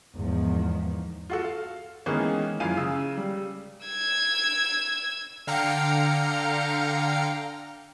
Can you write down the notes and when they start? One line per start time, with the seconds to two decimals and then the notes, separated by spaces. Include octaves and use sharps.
0.16 E2 G#2 D#3 F3
1.30 F4 F#4 A4
1.44 F5
2.06 D#3 E3 G#3 A#3 B3 C#4
2.60 F#2 F3 E4 F5 G#5 D#7
2.77 C#3 E6
3.17 G3
3.86 E6 G#6
5.47 D3 F5 G5 A#5 C#7